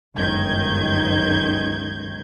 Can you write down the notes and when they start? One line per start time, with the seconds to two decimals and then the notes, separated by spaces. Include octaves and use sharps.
0.15 G1 C#2 F#2 D#3 G6 G#6